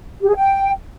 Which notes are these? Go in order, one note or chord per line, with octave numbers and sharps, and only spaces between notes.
G4
G#4
G5